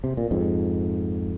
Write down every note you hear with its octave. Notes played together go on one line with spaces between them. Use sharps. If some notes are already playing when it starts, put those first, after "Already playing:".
C3
A#2
F2 G#2